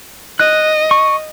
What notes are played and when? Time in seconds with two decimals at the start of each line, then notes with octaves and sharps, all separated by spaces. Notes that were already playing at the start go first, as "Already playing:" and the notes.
0.40 D#5 F#6
0.91 C#6